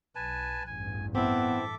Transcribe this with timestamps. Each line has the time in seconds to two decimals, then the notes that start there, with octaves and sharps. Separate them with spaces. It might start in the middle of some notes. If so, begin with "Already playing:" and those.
0.15 B1 B4 G#5 A5
0.67 A1 E2 G2 G#5
1.15 B3 C4 E4 A4 E5 D6